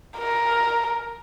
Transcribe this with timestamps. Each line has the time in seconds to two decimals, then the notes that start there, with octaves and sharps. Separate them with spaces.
0.18 A#4